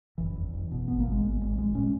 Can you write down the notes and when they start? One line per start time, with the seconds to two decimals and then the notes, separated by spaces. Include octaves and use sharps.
0.18 F#1 E3
0.36 E2
0.53 F#1
0.71 B2
0.88 G#1 B3
1.00 G#1 A#3
1.12 G#3
1.23 G#1
1.41 G#1
1.58 A#1 G#3
1.75 A#2 C#4